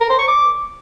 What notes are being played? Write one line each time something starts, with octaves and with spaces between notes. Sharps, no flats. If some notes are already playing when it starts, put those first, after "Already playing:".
A#4
C5
C#6
D6